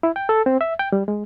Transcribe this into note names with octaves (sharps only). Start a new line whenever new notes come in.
E4
G5
A4
C4
E5
G5
G3
G#3